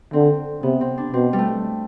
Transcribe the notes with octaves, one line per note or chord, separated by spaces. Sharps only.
D3 C4
C3 B3
C4
D4
B2 C4
G3
A3